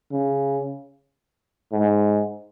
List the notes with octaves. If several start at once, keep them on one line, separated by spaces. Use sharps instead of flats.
C#3
G#2